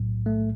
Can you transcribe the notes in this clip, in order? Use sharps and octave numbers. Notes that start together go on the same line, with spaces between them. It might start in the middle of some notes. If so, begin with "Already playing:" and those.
Already playing: B1 A2 F#3
A3